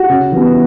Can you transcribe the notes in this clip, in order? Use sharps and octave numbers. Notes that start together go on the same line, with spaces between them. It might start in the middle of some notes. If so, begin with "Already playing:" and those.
Already playing: F#4
C#3
E3 G3 B3